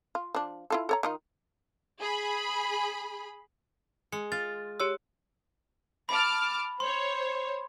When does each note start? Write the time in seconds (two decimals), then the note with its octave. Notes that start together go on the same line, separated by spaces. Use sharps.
0.15 F4
0.35 F3 D4
0.70 E4 F4 A4
0.89 A4 C#5 A#5
1.03 D#3 D#4 F4
2.01 G#4 B5
4.12 G#3 C#7
4.32 F4 A6
4.80 G4 C#5 E6
6.09 A5 B5 D6 F6
6.80 C5 C#5 C6